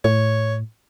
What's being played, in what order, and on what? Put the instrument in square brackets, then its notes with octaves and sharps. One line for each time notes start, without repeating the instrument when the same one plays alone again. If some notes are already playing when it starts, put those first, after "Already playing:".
[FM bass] A2 [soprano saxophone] C#5